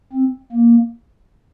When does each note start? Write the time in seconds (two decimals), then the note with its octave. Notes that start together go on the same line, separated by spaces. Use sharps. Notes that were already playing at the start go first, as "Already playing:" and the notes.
0.13 C4
0.52 A#3